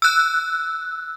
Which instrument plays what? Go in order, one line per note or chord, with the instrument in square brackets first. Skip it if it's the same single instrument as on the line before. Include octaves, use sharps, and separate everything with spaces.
[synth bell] E6 F#6